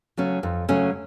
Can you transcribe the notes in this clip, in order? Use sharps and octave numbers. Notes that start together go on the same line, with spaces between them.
C#3 F#3 A3 C#4
F2
C#3 F#3 A3 C#4